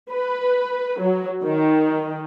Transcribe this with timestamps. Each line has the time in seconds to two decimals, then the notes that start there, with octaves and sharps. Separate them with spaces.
0.11 B4
0.99 F#3
1.43 D#3